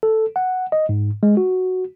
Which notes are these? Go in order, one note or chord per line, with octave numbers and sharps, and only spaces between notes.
A4
F#5
D#5
G#2
G#3
F#4